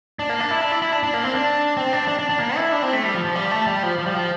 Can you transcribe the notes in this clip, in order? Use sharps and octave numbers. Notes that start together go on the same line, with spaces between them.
D4
A#3
D4
E4
D4
E4
E4
D4
D4
A#3
C4
D4
C4
D4
D4
D4
D4
A#3
E4
D4
C4
A3
G3
F3
F3
G3
A3
G3
F3
F3
G3
F3